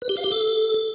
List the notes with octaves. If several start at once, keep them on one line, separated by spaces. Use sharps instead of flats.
B4
G4
F5
G4
A4